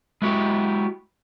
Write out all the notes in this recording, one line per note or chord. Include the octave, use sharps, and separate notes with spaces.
G#3 E4 F#4 G4